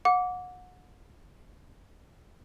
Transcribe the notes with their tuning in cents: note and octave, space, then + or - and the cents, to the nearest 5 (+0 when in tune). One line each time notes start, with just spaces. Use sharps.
F#5 -30 D6 -20